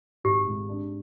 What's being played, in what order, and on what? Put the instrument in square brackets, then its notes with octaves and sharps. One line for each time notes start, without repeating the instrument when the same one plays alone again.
[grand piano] G#1 [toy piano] G4
[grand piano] G#2
D4